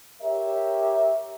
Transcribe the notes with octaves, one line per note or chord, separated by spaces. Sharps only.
G4 A#4 C#5 E5